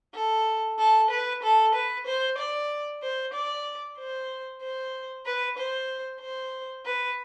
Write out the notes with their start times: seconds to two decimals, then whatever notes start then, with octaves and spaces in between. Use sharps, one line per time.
0.15 A4
0.78 A4
1.10 B4
1.43 A4
1.75 B4
2.07 C5
2.38 D5
3.03 C5
3.34 D5
3.98 C5
4.62 C5
5.26 B4
5.58 C5
6.21 C5
6.86 B4